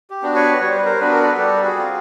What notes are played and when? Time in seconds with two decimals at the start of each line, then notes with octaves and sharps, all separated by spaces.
0.10 G4
0.22 B3 D4 F#4
0.35 B4 C#5
0.61 G3 C#5
0.69 C5
0.77 B4
0.85 A#4 C5
1.00 B3 D4 F#4 B4
1.11 A#4
1.23 A4 B4
1.38 G3 G4 A4
1.64 F#4 G#4
1.77 C4 F4